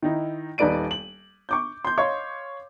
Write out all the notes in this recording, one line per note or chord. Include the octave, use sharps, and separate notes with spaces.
D#3 D#4 E4
D#1 D#4 B4 D5 D7 D#7
F#7
C#6 D6 G6
C6 G6
C#5 D#5 F5 C6 C#6